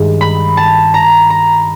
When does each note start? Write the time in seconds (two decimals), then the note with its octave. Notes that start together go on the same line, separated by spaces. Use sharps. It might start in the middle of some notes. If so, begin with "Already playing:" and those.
Already playing: G2 D#3 G#3
0.21 B5
0.57 A5
0.94 A#5
1.30 A#5